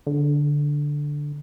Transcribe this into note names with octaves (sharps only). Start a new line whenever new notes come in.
D3